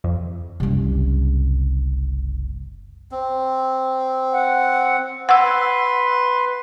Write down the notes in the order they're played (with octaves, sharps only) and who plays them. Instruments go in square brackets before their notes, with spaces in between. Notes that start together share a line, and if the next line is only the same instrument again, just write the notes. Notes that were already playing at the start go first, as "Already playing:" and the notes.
[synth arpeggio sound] F2
[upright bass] F#1 C2
[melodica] C4
[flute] F#5
[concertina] B4 C6 [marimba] F#5 E6